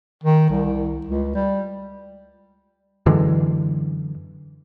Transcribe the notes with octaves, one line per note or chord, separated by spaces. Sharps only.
D#3
C2
C#2
G3
F#2 D3 E3 G#3